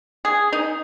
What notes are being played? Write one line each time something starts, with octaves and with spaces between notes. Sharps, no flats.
G#4
D#4